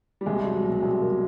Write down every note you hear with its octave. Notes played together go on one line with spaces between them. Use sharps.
G3
C2 G#3
F#3
B2
C2
A#3